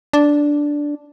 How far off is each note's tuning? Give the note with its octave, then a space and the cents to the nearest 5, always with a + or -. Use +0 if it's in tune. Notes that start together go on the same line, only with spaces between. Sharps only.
D4 -5